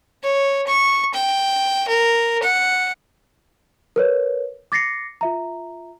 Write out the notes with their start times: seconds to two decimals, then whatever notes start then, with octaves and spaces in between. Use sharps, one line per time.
0.23 C#5
0.67 C#6
1.14 G5
1.88 A#4
2.43 F#5
3.96 A#4 B4 C#5
4.72 D6 A6 A#6 C7 C#7
5.21 F4 E5 A#5